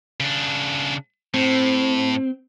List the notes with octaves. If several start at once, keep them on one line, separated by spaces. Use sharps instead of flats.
C#3 D4
A2 C4